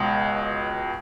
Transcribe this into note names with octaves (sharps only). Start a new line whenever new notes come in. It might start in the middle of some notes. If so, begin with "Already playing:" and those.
Already playing: C#2 B2